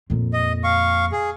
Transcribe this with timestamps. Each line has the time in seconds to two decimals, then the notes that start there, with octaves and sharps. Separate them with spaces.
0.10 F2 A#2
0.33 D#5
0.64 F5 C#6
1.12 G#4